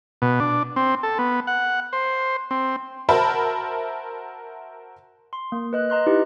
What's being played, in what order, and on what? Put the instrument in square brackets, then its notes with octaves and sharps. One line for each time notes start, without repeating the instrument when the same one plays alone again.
[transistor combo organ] B2
D4
C4
A4
B3
F#5
C5
C4
[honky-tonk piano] F#4 A#4 C5 E5 A5 B5
[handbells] C6
A#3
B4 D#5 F#6
D#5 A#5 C6 F#6
D#4 E4 G4 B4